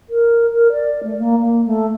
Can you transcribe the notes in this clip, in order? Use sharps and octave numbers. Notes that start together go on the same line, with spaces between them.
A#4
A#4
D5
A3
A#3
A#3
A3